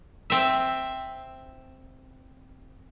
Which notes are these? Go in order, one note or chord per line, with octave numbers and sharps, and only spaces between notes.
C4 E5